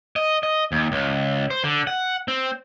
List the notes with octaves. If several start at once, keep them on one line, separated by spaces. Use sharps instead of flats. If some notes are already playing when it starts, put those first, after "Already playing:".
D#5
D#5
D#2
C#2
C5
D3
F#5
C4